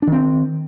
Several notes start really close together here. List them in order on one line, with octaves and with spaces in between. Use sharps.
D4 D#3 C4